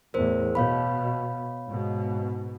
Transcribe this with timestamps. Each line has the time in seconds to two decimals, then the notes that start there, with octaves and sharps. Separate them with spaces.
0.14 E2 A2 A#4 C5
0.55 B2 C#5 F5 B5
1.68 G#2 B2